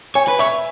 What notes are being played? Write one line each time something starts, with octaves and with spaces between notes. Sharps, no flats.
C#5 G#5
B4
C#5 E5